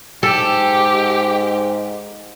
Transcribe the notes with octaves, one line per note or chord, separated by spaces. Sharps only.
G#2 G4 A4